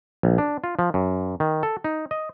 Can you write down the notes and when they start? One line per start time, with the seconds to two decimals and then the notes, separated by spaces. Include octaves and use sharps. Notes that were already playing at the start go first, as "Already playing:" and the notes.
0.23 A#1
0.38 D4
0.64 F4
0.79 F3
0.94 F#2
1.40 D#3
1.63 A4
1.84 D#4
2.11 D#5